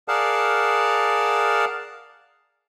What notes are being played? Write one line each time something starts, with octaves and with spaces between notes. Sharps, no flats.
G#4 A#4 D5 F5 F#5 A5